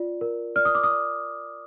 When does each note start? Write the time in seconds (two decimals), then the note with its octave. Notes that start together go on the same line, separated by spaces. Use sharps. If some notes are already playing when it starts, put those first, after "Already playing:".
Already playing: F4 D5
0.21 A#4
0.56 D5 F6
0.65 D#6
0.75 D6
0.83 D#6
0.91 D5